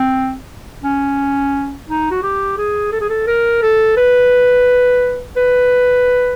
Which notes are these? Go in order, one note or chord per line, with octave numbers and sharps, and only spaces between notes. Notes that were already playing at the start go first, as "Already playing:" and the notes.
Already playing: C4
C#4
D#4
F#4
G4
G#4
A4
G#4
A4
A#4
A4
B4
B4